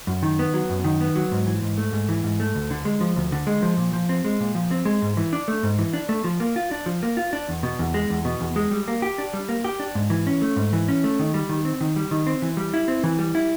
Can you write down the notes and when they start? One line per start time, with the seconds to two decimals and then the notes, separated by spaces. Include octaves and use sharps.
0.07 F#2
0.23 D#3
0.39 B3
0.54 F#3
0.70 F#2
0.84 D#3
1.01 B3
1.15 F#3
1.32 G#2
1.47 E3
1.62 G#2
1.78 A3
1.92 G#2
2.09 E3
2.24 G#2
2.40 A3
2.55 D2
2.70 D3
2.85 G#3
3.01 F3
3.16 D2
3.32 D3
3.47 G#3
3.63 F3
3.77 A#2
3.93 F3
4.09 C4
4.25 G#3
4.40 A#2
4.55 F3
4.71 C4
4.85 G#3
5.02 G#2
5.17 E3
5.33 D4
5.48 A3
5.63 G#2
5.79 E3
5.94 D4
6.09 A3
6.24 F3
6.40 A#3
6.56 F4
6.71 D4
6.86 F3
7.03 A#3
7.17 F4
7.33 D4
7.49 E2
7.63 B2
7.79 E2
7.94 G#3
8.10 E2
8.25 B2
8.41 E2
8.56 G#3
8.71 G3
8.88 A#3
9.02 G4
9.18 D4
9.33 G3
9.49 A#3
9.64 G4
9.80 D4
9.95 G#2
10.10 E3
10.27 C#4
10.42 A3
10.56 G#2
10.73 E3
10.88 C#4
11.04 A3
11.19 D#3
11.34 G3
11.49 D#3
11.65 C4
11.81 D#3
11.96 G3
12.11 D#3
12.27 C4
12.42 E3
12.57 G3
12.74 E4
12.88 C4
13.04 E3
13.19 G3
13.35 E4